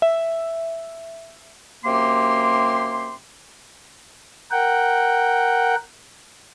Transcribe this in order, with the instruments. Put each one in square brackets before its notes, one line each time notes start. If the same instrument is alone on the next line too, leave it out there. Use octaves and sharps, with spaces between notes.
[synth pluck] E5
[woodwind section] F#2 C3 A#3 G4 C6
[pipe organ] A#4 F#5 G5